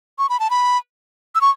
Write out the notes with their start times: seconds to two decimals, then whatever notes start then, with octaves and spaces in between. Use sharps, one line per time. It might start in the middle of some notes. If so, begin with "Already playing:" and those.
0.19 C#6
0.29 B5
0.40 A5
0.50 B5
1.35 E6
1.41 C#6